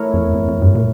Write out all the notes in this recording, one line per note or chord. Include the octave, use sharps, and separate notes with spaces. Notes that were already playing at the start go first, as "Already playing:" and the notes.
Already playing: A3 E4 A#4 C#5
F2
F2
F2
G2
A#2